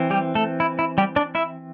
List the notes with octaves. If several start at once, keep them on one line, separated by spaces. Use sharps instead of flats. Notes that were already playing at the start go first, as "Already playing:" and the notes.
Already playing: E3 C4
G3 G4
A3 A4
E4
E4
G3 G4
D4 D5
E4 E5